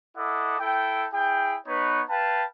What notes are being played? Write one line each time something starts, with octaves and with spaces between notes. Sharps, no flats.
E4 A4 D#5 F#5 D6
E4 A4 G5
E4 G#4 G5
B3 D#4 B4 C#5 C#6
B4 F5 G5 A5